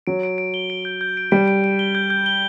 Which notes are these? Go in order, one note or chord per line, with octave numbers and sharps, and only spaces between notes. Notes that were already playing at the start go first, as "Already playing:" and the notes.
F#3 D7
D7
D7
G7
D7
G6
G6
D7
G3 D7
D7
D7
G7
G6
G6
G7